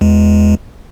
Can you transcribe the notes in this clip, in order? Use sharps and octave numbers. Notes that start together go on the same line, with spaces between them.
E2 G#3